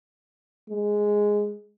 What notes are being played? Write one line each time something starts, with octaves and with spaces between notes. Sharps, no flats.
G#3